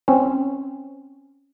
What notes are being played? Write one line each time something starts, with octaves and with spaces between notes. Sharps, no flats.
C4 C#4